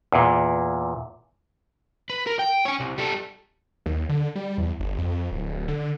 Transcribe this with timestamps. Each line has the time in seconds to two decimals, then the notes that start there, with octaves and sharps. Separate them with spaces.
0.12 E2 A#2
2.10 B4
2.27 A#4
2.39 G5
2.65 C#5 G#5
2.80 C2
2.98 G3 A4
3.86 D#2
4.09 D3
4.35 G3
4.58 E2
4.80 G1
4.98 F2
5.32 D1
5.68 D3